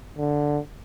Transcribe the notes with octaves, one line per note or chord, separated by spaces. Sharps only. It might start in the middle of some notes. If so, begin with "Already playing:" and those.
D3